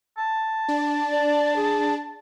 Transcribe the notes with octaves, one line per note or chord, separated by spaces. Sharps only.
A5
D4
D5
G#4